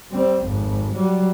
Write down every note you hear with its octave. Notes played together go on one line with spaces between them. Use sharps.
G3 C4
G#1 F2
F#3 G3